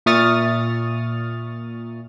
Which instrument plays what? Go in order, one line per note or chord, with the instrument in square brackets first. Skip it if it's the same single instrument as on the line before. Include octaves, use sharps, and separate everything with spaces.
[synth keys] A#2 E5 C#6 D#6 F6 A6